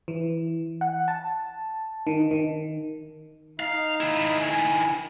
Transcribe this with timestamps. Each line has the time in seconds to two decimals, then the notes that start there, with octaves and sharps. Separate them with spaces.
0.08 E3
0.81 F#5
1.08 A5
2.07 D#3
2.31 D#3
3.60 D#4 F5
4.00 D#3 E4
4.40 G#5